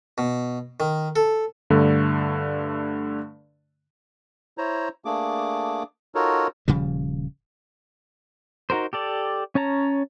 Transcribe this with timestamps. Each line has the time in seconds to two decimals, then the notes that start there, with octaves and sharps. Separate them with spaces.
0.18 B2
0.80 D#3
1.16 A4
1.70 G2 D3 A3
4.58 E4 C5 C#5 A#5
5.05 A3 A#3 D4 G#4 D6
6.15 D#4 F4 F#4 A4 A#4 C#5
6.68 D#1 C#3 F3 G3
8.70 D#4 F#4 A#4 C5
8.93 G4 A4 D5
9.55 C#4 C#5 A5 A#5